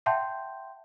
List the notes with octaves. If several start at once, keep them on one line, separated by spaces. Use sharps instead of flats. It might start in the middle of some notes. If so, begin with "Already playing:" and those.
E5 F#5 G5 A5 C6 G6